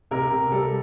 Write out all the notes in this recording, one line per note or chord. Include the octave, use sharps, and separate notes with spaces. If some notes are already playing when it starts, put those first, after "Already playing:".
C3 A#4
C3
G3 A4